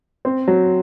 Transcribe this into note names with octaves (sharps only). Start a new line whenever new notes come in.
C4
F#3